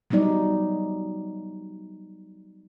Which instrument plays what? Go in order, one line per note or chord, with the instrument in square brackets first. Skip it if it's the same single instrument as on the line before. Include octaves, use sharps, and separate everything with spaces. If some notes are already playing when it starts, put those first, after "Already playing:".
[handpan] F#3 G3 B3 D#4 D5